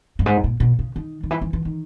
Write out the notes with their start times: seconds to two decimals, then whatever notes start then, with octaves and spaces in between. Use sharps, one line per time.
0.19 G2
0.26 G#2
0.44 A#2
0.60 B2
0.79 C#3
0.96 D#3
1.23 D#3
1.31 E3
1.41 E3
1.53 E3
1.65 D#3